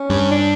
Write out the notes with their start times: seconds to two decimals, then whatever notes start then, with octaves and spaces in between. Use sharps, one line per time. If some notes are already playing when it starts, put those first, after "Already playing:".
Already playing: C#4
0.10 G2
0.31 D4